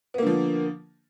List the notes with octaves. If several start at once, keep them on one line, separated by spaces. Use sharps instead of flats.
D3 F3 A#3 B3